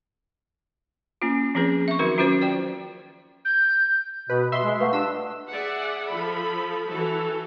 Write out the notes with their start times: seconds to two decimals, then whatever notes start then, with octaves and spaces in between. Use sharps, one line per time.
1.22 A#3 C#4 F4
1.55 F3 C4 C#4 G#4 B4
1.88 E5 C#6
1.99 D#3 F#3 D#4 F#4 A#4
2.18 C#4 F4 F#4 B4 C5
2.42 C5 D5 G5
3.45 G6
4.30 B2 B4
4.52 B2 E5 C6
4.64 G#3
4.80 A3 B4 F5 F#5
4.93 D4 F4 G4 A5 E6
5.49 G#4 D5 E5 F#5
6.07 F3 A4 B5
6.88 E3 F#4 A4